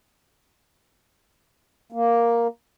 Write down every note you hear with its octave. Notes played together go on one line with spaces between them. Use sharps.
A#3